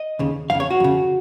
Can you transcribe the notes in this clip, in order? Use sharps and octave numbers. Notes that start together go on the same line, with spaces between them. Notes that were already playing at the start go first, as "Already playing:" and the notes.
Already playing: D#5
D#2 C#3
F2 C#3 F5
C#5
F#4
F2 C#3